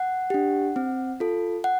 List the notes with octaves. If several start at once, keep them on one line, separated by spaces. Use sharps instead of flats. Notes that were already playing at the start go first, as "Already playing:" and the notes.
Already playing: F#5
D4 G4
C4
F4 A4
F#5